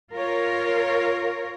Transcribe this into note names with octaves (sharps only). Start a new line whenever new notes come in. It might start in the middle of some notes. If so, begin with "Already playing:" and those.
F4 A#4 C#5